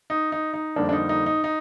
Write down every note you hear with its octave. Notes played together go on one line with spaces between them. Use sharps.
D#4
D#4
D#4
F2 D3 G3 A#3 D4
D4
D#4
D#4
D#4
D#4